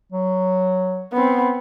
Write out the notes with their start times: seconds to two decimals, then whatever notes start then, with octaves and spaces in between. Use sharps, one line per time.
0.12 F#3
1.13 B3 C4